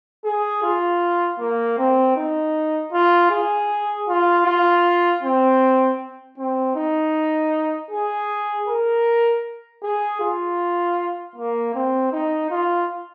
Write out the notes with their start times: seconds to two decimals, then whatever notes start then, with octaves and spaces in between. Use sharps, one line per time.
0.25 G#4
0.63 F4
1.39 A#3
1.78 C4
2.16 D#4
2.93 F4
3.31 G#4
4.08 F4
4.46 F4
5.23 C4
6.38 C4
6.76 D#4
7.91 G#4
8.68 A#4
9.83 G#4
10.21 F4
11.36 A#3
11.74 C4
12.12 D#4
12.51 F4